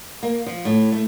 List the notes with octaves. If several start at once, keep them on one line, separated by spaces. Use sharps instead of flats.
A#3
F3
A2
A3